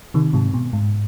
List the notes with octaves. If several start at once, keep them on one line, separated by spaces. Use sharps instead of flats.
C3 D#3
G#2 C3
B2
G#2